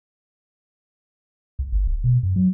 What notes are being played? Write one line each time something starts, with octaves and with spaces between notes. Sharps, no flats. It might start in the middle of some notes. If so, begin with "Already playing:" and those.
C#2
G1
D1
B2
F#2
F#3